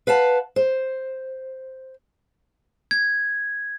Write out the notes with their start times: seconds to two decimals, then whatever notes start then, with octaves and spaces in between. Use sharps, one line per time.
0.07 B4 F5 F#5 A5
0.56 C5
2.91 G#6